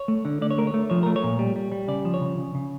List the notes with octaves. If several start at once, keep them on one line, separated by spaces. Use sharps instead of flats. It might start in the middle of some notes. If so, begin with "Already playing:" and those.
Already playing: C#5
A3
D3
D3 D5
C#5
A3 A#4
C#5
A3
F3 C#5
A3 A#4
C#5
A#2
G3
G3
G3
C#3 D5
F3
C#5
C#3
C#3
C#3